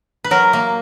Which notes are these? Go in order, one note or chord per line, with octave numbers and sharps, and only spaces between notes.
B4
F#3 A#4
A#3